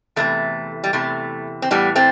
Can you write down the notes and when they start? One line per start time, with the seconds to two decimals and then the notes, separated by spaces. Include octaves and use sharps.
0.16 E2 C3 E3 A3
0.84 G3
0.93 E2 C3 E3 A3
1.62 C4
1.71 A2 E3 G3 B3
1.95 A3 C4